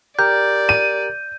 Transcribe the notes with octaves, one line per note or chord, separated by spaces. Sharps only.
G4 A#4 D5 G6
D#7